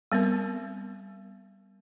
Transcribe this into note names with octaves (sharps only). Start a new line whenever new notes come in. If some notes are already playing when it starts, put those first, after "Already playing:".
G3 B3 C4 A#4